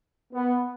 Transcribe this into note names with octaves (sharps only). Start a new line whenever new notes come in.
B3